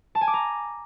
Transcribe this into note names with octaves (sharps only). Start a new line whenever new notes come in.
A5
G#5
D6
A#5